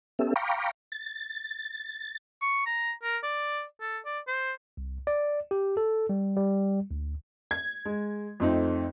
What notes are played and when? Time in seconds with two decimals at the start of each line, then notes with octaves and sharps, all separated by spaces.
0.19 B3 C#4 G4 A4 E5
0.36 F5 G5 A#5 B5 C#6 D6
0.92 A6
2.42 C#6
2.66 A#5
3.03 A#4
3.23 D5
3.82 A4
4.06 D5
4.28 C5
4.77 C2
5.07 D5
5.51 G4
5.77 A4
6.09 G3
6.37 G3
6.91 D2
7.51 G#6
7.85 G#3
8.40 F2 A3 C4 D#4